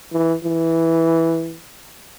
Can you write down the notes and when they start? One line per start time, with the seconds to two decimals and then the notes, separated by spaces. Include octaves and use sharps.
0.13 E3
0.44 E3